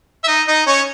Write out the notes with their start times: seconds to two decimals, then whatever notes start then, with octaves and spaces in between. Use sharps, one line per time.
0.24 E5
0.28 D#4 D#5
0.48 D#4 D#5
0.67 C#4 C#5